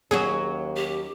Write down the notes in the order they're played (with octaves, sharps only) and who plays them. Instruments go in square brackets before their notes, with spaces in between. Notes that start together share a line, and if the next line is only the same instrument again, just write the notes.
[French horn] D#2 [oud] F#3 C#4 F#4 [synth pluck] G#4
[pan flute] G4